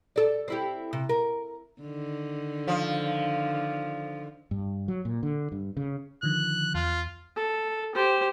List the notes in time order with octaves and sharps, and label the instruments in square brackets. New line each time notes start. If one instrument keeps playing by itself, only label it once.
[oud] A4 D5
C4 E4 G4
C3
A#4
[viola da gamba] D3 D#3
[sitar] F3
[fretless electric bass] G2
F#3
A#2
D3
G2
C#3
[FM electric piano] D3 D#3 F3 [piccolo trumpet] F#6
[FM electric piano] E2 F6 [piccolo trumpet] F4
[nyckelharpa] A4
G4 C5